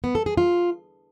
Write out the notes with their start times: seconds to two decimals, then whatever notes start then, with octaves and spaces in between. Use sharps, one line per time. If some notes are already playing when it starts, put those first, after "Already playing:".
0.04 B3
0.15 A4
0.26 G#4
0.37 F4